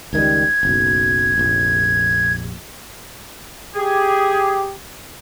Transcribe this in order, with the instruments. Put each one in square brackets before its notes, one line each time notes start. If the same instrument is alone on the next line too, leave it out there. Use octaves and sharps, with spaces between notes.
[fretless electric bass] C#2 D#3 G3 [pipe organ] G#6
[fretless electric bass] F#1 B1
F1 A#1
[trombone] G4 [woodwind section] G#4